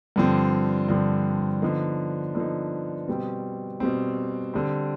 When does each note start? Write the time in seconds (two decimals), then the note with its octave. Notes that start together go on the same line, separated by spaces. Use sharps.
0.16 G2 D3 F3 C4
0.89 G2 D3 F3 C4
1.62 D3 F3 B3 D#4
2.35 D3 F3 B3 D#4
3.08 B2 G3 C4
3.80 B2 G3 C4
4.54 D3 G3 C4